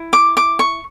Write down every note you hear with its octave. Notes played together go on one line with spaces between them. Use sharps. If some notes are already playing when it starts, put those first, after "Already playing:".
Already playing: E4
D6
D6
C#6